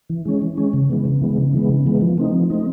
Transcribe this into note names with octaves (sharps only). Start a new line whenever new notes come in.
E3
G#3 C#4
E3
G#3 C#4
C#3
E3 G#3 B3
C#3
E3 G#3 B3
C#3
E3 G#3 B3
C#3
E3 G#3 B3
F3
A3 C4 D#4
F3
A3 C4 D#4